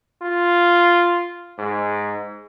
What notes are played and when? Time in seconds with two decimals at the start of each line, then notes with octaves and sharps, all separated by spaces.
0.22 F4
1.58 G#2